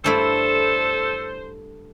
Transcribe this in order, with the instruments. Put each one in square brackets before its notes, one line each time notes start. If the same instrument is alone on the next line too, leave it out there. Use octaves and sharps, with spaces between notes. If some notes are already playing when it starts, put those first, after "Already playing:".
[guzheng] G2 A3 E4 [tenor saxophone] A4 [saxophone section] C5